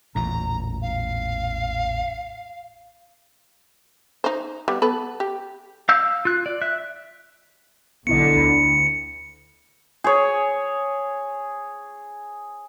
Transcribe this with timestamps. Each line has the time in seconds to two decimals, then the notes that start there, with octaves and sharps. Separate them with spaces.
0.15 A1 E2 A#2 A#5
0.82 F5
4.24 D#4 C5
4.68 G3 B3
4.82 B3 A4 B4
5.20 G4
5.89 F5 E6 G6
6.25 F4 F#6
6.46 D5
6.62 E5 F#6
8.07 B1 D3 B3 E4 D#5 C#7
8.38 D2 B5
10.04 G#4 C#5